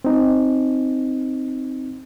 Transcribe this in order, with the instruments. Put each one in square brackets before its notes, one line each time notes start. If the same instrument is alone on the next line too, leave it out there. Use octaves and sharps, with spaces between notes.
[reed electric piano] C4 D#4